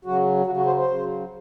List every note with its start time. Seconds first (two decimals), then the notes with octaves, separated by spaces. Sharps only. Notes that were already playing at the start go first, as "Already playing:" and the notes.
0.05 C#3 F#3 F#4
0.46 C#3 F#3 F#4
0.57 F#4
0.66 C5
0.77 C5
0.88 C#3 F#3